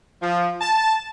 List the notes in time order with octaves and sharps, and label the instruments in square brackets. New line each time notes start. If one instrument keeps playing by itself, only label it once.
[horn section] F3
A5